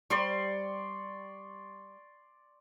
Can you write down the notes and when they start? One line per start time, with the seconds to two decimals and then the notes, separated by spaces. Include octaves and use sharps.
0.10 G3 G4 C5 D5 C6 C#6